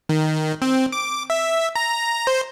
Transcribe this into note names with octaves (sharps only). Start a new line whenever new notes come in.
D#3
C4
D6
E5
A#5
C5